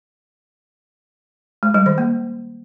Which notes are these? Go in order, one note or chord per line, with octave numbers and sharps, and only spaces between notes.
G#3
G3
D#3
A#3